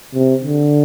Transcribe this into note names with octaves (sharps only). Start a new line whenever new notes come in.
C3
D3